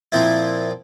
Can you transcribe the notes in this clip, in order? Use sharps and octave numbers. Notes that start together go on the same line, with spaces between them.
A#2 F3 C4 E4